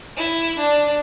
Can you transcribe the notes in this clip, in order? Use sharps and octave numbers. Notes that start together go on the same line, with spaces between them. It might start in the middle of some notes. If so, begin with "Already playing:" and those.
E4
D4